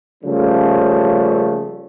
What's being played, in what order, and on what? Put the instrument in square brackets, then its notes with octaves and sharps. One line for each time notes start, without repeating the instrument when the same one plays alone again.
[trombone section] C#3 F3 G3 A3 A#3 C#4